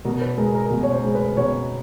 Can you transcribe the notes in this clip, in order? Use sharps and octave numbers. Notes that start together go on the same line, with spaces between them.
B2 A#4
B4
G#3 A#4
A#4
B2
C#5
C5
G#3
B4
B2 C#5